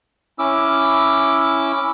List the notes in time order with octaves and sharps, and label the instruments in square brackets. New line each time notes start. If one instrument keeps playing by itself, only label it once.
[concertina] C#4 E4 D6 E6